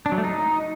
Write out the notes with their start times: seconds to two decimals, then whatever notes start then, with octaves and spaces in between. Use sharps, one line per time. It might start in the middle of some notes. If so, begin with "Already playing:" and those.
0.06 D4
0.12 F#3
0.18 A3
0.24 D#4